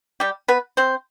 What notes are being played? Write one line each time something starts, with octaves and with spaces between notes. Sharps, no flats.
G3 G4
B3 B4
C4 C5